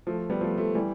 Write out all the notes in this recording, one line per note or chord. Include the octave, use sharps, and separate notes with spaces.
F3 A3
G3 B3
F3 A3
F3 A3
E3 G3